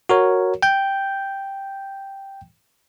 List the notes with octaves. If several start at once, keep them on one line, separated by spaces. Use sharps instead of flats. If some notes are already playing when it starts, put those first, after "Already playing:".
F#4 A#4 C#5
G5 G6